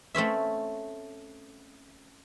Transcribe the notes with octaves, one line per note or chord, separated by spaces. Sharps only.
A3 C4 C#4 E5